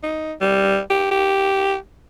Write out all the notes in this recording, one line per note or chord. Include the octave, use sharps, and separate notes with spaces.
D#4
G3
G4
G4